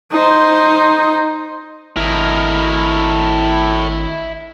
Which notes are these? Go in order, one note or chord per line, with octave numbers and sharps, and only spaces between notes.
D#4 C5
G#1 A2 E4 A#4 D#5